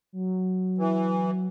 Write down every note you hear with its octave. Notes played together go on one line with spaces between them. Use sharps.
F#3
E3